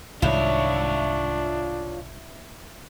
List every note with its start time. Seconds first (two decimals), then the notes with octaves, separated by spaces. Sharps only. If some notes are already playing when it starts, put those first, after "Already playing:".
0.22 C2 G#2 D#3 D4 E4 F4 C#5